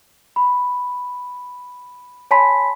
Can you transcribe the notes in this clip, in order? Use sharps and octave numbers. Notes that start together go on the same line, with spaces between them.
B5
C#5 G#5 A5 B5 C6 B6